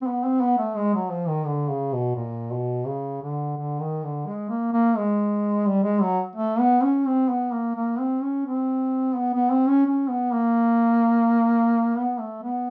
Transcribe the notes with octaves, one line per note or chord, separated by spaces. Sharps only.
C4
B3
C4
B3
A3
G#3
F#3
F3
D#3
D3
C#3
B2
A#2
B2
C#3
D3
D3
D#3
D3
G#3
A#3
A#3
G#3
G3
G#3
F#3
A3
B3
C#4
C4
B3
A#3
A#3
C4
C#4
C4
B3
B3
C4
C#4
C#4
B3
A#3
B3
A3
B3